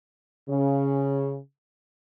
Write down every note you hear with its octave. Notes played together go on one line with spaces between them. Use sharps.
C#3